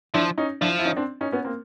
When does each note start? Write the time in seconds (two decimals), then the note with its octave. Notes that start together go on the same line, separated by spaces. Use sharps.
0.14 F3 D4 E4
0.38 C#4 D#4
0.61 F3 D4 E4
0.79 E4
0.85 C#4 D#4
0.97 C4 D4
1.21 C#4 D#4
1.32 B3 C#4
1.45 A#3 C4